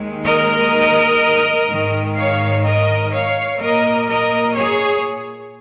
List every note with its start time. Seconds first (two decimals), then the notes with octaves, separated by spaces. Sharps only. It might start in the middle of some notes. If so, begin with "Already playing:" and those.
Already playing: D#2 D#3 G#3
0.25 A#4 D#5
1.68 G#2 D#3 G#3
2.16 C#5 F5
2.64 A#4 D#5
3.12 C#5 F5
3.59 A#2 A#3 A#4 D#5
4.08 A#4 D#5
4.55 G#4 C#5